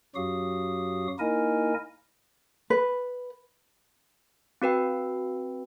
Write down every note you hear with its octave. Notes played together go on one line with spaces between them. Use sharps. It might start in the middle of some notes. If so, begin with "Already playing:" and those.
F#2 F#3 F#4 G4 F5 D#6
A#3 D#4 E4 A#4 D#5 G#5
B4
C4 F#4 B4 G5